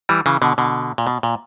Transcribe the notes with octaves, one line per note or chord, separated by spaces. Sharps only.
E3 G3
C#3 E3
B2 D3
B2 D3
A#2
B2
A#2